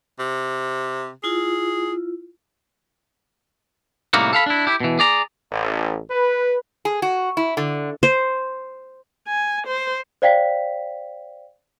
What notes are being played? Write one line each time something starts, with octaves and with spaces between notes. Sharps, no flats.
C3
E4 F4 G#4
A2 C3 G3 A#3 D#4 F#4
A4 F5 B5
D4 E4
E4 G4
B2 E3
G#4 D5 A#5
A1
B4
G#4
F#4
E4
D3
C5
G#5
C5
C5 D5 F5 G5 B6